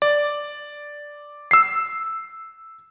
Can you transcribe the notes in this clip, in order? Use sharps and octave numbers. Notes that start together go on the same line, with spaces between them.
D5
E6 C7